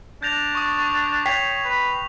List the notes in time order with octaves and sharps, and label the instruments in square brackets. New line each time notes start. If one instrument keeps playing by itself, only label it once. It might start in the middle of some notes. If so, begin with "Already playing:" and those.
[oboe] D4 [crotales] G6 A#6 F7
[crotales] C#6 D#6
C#6
[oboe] C#5 [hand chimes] G5 B6 C7 [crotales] F7
[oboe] B4